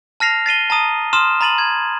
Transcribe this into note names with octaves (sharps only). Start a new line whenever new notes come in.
A5 F6 A#6 C7 F7
A6 C7 D#7 G7
A5 A#5 D#6 D#7
C6 D#6 F6 E7
A#5 B5 A6 D#7 F#7
G#6